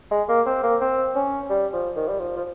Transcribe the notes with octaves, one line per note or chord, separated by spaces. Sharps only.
G#3
A#3
C4
A#3
C4
C#4
G3
F3
D#3
G3
F3
F3